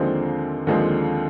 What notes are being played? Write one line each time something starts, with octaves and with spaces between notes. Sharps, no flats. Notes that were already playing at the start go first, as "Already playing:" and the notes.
Already playing: D#2 D3 F3 G#3 C4
D#2 D3 F3 G#3 C4